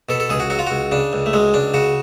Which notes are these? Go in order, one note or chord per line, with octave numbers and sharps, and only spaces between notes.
B2 A4
A4
C#2 G#4
F#4
F#3 F#4
F4
C#2 F#4
C#3 D4
C#2
A3
F#3 G#3
C#2 D4
C#3 F#4